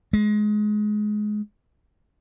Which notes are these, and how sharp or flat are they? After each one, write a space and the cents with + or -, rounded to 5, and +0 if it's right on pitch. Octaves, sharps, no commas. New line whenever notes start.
G#3 +20